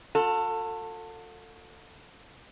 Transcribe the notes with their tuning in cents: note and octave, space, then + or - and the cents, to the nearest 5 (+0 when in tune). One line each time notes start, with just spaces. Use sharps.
F#4 -45 A4 +25